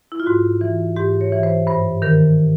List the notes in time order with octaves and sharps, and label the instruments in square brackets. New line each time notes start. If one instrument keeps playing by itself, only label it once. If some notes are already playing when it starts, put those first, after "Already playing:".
[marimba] E4
F4
G#2 F#4
E3
G#2 G4
C#5
E3
C5
G2 C5
D#3 A#4